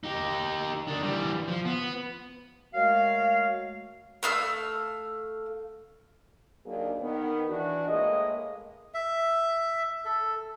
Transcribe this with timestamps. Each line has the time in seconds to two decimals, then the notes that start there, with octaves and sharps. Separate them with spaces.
0.04 D#4 G4
0.88 D#3 D4
1.03 E3 G3
1.48 F3
1.65 B3
2.74 G#3 A3 F#4 A#4 C#5 F5
4.23 A3 F5 E6
6.65 D#2 F#3 A#3 D4 G#4 A#4
7.01 D#3 B3
7.48 E3 D4 F#4
7.88 A2 G#3 A#3 D#5
8.94 E5
10.05 A4